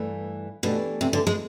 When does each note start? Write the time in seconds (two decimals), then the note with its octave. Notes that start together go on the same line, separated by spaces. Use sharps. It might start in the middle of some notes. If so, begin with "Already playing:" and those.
Already playing: G2 E3 A3
0.63 B2 E3 A3 D4 G4
1.01 C3
1.13 D3
1.27 G#3